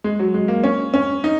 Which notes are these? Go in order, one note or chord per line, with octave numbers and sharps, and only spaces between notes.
G#3
F#3
G#3
A#3
C#4
C#4
D#4